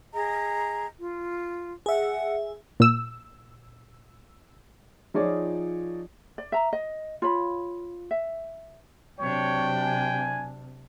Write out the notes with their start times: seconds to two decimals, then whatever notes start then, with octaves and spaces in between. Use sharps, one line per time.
0.13 G#4 D#5 A#5
0.98 F4
1.86 G#4 E5 F#5
2.80 A#2 E6
5.14 F3 D#4 F4 G#4 C#5 D5
6.38 D5
6.52 E5 A#5
6.73 D#5
7.22 F4 C#5 B5
8.11 E5
9.19 C3 F#3 D4 C#5 G5
9.83 G#5